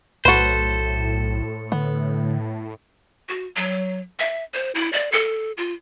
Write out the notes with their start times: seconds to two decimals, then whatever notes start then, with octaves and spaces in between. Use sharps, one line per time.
0.25 B1 A2 F#4 A4 B4 C5
1.72 D3 B3
3.29 F#4
3.56 F#3
4.19 E5
4.54 C5
4.75 E4
4.93 D5
5.12 A4
5.57 F4